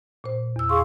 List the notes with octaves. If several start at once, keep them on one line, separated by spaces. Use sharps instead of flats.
A#2 C5
E2 E6
G#4 F5 C6 C#6